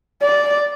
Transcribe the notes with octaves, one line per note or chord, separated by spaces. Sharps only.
D5